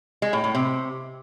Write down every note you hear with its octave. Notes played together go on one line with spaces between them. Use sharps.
G#3
A2
A2
C3